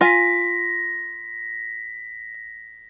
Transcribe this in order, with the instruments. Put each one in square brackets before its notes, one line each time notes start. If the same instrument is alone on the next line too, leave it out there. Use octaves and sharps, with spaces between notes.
[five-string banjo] F4 G#5 [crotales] A#6 B6